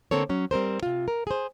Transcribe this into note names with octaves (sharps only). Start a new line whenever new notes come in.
D3 A#3 C4 A4 C#5
F#3 C#4
G3 C4 A#4 C5
C3 F4
A#4
G#4 C5